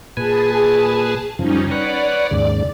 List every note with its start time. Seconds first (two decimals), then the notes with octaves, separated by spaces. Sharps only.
0.17 A#2 G#4 B4 G#5 A5
1.39 F#2 C#3 F3 G3 C#4 D#4
1.71 B4 C#5 D5 F#5
2.31 D#2 G#2 C#3